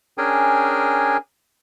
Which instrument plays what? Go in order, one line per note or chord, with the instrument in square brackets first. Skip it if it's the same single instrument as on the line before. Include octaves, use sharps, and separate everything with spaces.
[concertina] C#4 D4 G#4 A#4 G5 G#5